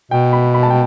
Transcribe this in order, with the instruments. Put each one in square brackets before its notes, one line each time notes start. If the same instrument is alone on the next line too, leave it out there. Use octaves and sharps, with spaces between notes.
[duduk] B2 [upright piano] G5
[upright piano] B5
B5
A5
G5